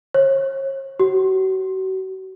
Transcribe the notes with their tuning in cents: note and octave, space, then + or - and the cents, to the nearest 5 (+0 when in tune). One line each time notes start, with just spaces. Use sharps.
C#5 -40
F#4 +40